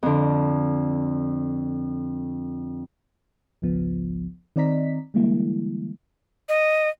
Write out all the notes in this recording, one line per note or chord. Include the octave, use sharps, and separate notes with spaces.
F2 D3
G#1 C#2 F3 B3
D#3 C4 D5 D#5 A#5 B6
D3 E3 G3 G#3 A#3 E4
D#5